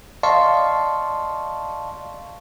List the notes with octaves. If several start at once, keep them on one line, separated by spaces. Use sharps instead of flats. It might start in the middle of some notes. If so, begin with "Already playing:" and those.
D5 D#5 F5 A5 C6 C#6